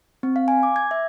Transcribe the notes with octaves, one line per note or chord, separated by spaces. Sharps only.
C4
F5
G#5
D6
G#6
E5